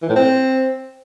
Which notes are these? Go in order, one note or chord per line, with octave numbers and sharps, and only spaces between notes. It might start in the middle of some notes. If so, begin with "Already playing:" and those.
E3
A2
C4